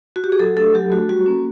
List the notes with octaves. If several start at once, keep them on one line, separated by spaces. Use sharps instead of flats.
F#4
G4
G#4
F#3 A4
A3 D4 A4
F#3 G4
A3 D4 F#4
G3 F#4
A#3 C#4